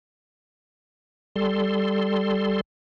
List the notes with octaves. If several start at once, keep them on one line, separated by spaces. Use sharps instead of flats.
G3 A4 C6